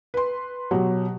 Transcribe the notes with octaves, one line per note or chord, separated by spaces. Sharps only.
B4 C6
B2 F#3 G4